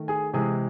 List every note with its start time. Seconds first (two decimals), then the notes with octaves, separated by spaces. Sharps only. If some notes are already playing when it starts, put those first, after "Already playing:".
Already playing: D#3 A3
0.08 G#4 G#5
0.33 C3 E3 G#3 G#4 G#5